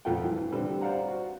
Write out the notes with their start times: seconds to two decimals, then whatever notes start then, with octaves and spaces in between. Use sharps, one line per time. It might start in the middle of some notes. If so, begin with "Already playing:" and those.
0.05 F2 A3 F4 F#5 G5
0.23 G2 E3
0.52 D3 G3 C4 D4 A4 B4
0.81 C5 D5 F5 F#5 A#5
1.08 F#4